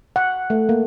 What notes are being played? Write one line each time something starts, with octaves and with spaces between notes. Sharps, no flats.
F#5
A3
A#3